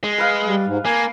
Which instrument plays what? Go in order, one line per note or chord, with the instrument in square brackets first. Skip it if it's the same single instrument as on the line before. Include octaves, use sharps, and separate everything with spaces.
[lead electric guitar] G#3
[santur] B4 F5
[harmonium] G3
G#2
[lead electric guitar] A#3 [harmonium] G#5